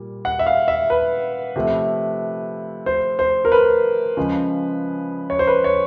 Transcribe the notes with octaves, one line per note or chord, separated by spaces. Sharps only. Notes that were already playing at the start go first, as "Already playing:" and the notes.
Already playing: A#2 G3
F#5
E5
F5
E5
B4
C3 F3 A3
C5
C5
A#4
B4
C#3 F3 G#3
C#5
C5
B4
C#5